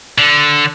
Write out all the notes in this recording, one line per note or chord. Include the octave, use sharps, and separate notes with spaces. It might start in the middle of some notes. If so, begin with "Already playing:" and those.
D3